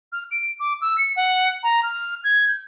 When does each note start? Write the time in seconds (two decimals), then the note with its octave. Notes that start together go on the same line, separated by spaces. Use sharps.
0.12 F6
0.31 D7
0.60 D6
0.81 E6
0.98 C#7
1.16 F#5
1.63 A#5
1.83 F6
2.24 G#6
2.48 G6